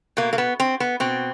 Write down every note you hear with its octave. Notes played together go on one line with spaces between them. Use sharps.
B2 A#3
A#3
B3
C4
B3
B2 C4